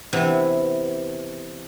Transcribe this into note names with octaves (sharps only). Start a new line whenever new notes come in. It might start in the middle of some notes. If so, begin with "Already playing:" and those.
C3 E3 B3